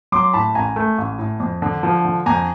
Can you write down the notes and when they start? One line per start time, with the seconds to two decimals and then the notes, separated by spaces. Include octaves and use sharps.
0.12 F#3 C6 D6
0.33 A2 A5 B5
0.55 A1 G#5 A#5
0.76 A3
0.98 A1
1.19 A2
1.40 F2
1.62 D3
1.83 F3
2.05 D3
2.26 F2 G#5 A#5